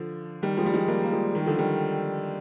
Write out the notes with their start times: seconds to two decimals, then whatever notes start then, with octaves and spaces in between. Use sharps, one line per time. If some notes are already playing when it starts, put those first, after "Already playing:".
Already playing: D3 F3
0.42 D#3 G3
0.57 F3 G#3
0.66 G3
0.74 F3 G#3
0.88 G3 A#3
1.03 A#3
1.12 F3 G#3
1.35 D#3 G3
1.46 D3 F3
1.58 D#3 G3